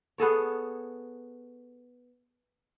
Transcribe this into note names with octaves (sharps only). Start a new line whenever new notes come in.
B3 G#4 A4 C#5